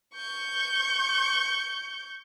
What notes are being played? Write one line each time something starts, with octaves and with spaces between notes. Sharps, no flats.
C#6 G6